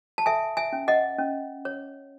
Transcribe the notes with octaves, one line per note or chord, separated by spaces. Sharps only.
A5
A4 E5 G#5
E5 G#5
C#4
D#5 F#5
C#4
C#5